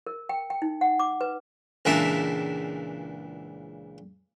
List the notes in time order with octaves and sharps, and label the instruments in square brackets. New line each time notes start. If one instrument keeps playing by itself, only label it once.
[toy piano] A#4
G5
G5
D#4
F#5
D6
B4
[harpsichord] C#2 A#2 E3 D4 E5